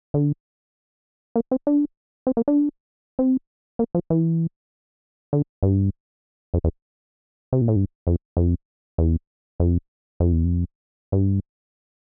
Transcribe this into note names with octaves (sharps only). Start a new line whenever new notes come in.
D3
A#3
C4
D4
C4
A#3
D4
C4
A#3
F3
E3
D3
G2
F2
E2
C3
A#2
A2
G2
F2
F2
E2
F2
F2
E2
F2
G2